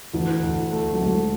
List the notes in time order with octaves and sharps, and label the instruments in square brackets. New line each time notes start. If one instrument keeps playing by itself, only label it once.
[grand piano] D2 [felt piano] E3
[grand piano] D2
A3
[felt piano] F#3
[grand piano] D2 [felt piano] G#3